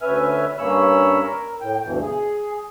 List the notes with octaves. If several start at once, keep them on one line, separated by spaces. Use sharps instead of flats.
D2 C#4 B4 E5 G#5 F6
G2 A#3 C#4 C#5 B5 E6
A#4
A2 G5
D2 G2 B2 E3
G#4